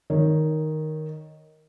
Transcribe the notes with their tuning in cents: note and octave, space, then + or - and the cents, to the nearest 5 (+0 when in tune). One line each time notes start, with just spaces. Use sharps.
D#3 +0 C#5 +0